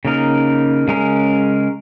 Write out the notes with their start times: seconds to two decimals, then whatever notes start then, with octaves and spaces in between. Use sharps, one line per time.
0.05 C#3 A#3 D#4 A#4
0.88 C#3 G#3 C#4 A#4